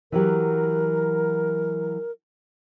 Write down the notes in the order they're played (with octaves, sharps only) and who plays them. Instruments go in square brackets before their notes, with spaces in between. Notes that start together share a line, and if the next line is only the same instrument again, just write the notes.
[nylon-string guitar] E3 F#3 G4 [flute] A#4